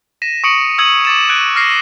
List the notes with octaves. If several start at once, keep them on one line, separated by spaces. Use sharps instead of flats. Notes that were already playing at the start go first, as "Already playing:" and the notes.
A#6 B6 D#7 E7
C#6 D#6 C#7 D7 F#7
D#6 E6 G#6 D#7 F#7
D6 A6 E7
F#6 G#6 D7 D#7
D6 F6 A#6 C7